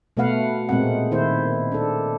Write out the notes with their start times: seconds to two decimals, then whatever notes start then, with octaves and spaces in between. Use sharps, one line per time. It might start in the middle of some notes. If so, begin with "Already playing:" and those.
0.17 B2 A3 B3 B4 F5 F#5
0.69 A#2 G#3 A#3 C4 F#5
1.11 D#3 E4 C5
1.72 D4 A4